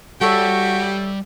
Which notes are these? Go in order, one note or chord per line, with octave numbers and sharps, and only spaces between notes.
G3 F#4 G4 A4 C#5 D5 E5